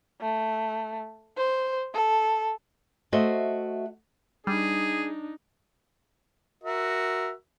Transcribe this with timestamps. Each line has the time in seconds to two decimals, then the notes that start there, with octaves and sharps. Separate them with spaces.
0.21 A3
1.38 C5
1.94 A4
3.12 A3 F#4 C5 D#5 E5
4.47 G3 D4 D#4 G#4
6.64 F#4 A#4 E5